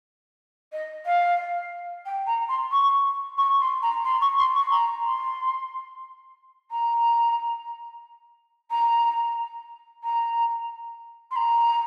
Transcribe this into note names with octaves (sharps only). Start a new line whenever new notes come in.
D#5
F5
G5
A#5
C6
C#6
C#6
C6
A#5
C6
C#6
C6
C#6
A#5
C6
A#5
A#5
A#5
C6
A#5